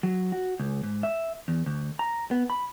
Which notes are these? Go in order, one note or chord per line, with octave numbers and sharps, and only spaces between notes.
F#3
F#4
C#2
G#2
E5
E2
D2
A#5
B3
B5